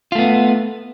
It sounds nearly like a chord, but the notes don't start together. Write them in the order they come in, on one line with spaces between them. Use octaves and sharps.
F4 A3 B3